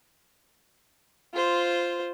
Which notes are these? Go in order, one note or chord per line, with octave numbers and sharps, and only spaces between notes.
F4 C5